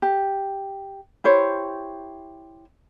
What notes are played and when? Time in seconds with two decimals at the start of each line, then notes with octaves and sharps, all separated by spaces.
0.02 G4
1.24 E4 G4 C5 C#5